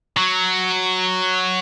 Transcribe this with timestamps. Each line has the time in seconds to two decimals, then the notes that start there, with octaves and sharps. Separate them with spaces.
0.17 F#3